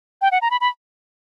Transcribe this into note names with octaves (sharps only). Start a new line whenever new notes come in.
G5
F#5
A#5
B5
B5